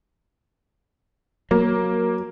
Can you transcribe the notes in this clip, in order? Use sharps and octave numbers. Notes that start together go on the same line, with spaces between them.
F#3 A#3